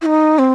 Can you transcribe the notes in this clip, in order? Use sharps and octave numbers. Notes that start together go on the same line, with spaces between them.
E4
D#4
C4